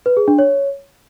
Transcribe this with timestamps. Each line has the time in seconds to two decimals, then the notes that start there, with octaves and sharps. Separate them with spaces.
0.06 B4
0.17 G#4
0.28 D4
0.39 C#5